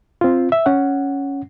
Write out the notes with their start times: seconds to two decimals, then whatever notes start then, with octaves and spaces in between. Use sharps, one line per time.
0.21 C4 F4
0.52 E5
0.66 C#4 F#5